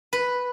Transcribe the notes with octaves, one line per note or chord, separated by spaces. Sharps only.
B4